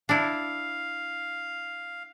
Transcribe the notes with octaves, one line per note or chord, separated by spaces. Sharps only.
D4 E4 F5